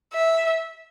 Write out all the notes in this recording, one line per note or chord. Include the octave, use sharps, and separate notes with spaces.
E5